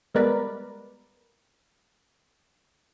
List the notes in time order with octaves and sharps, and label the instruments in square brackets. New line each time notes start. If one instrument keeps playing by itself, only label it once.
[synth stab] G3 G#3 B3 A#4 B4 D5